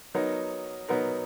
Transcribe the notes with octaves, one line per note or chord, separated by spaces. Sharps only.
F#3 B3 D#4 A#4
F#3 B3 D#4 A#4